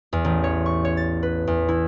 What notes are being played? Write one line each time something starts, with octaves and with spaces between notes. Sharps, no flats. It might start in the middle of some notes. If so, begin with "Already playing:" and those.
E2
A1
C#5
C#6
C#5
A6
B4
E2
E4